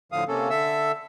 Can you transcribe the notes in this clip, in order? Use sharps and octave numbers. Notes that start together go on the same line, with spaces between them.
A2 D3 F3 F5 D#6
C3 A#3 C#4 A4
D3 A4 E5 E6